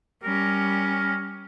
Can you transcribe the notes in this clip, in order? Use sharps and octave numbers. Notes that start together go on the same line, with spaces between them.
G3 C#4 A#4